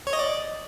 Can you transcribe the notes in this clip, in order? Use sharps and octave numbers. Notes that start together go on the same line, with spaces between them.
C#5
D#5
D5